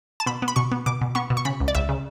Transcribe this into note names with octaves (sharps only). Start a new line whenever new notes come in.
A5
B2 B5
B3
B5
B2 C#6
B3
B2 D6
B2
B3 C#6
B2
C#6
C#3 B5
C#2
D5
C#2 E5
C#3